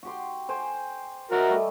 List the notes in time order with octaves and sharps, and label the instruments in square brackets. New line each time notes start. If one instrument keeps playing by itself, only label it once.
[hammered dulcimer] F#4 G4 C6
C5 G5 G#5
[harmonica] F#4 A#4 [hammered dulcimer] C#5 D#5 E5
[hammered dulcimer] G3 A3